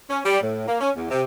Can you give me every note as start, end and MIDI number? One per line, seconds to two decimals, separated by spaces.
0.09 0.19 61
0.25 0.39 55
0.41 0.65 45
0.67 0.79 58
0.81 0.90 61
0.95 1.05 40
1.11 1.22 48